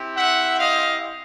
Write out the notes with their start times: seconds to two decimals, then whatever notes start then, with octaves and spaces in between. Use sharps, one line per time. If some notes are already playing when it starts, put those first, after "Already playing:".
Already playing: C4 E4 G4
0.17 E5 F#5
0.59 D#5 F5